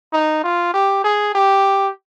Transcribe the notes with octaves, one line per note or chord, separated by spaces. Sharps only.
D#4
F4
G4
G#4
G4